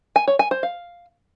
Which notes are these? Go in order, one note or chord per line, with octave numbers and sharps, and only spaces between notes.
G#5
C#5
G#5
C5
F5